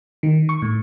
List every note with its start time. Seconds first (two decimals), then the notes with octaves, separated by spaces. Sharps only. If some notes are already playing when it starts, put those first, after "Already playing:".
0.23 D#3
0.49 C#6
0.62 A2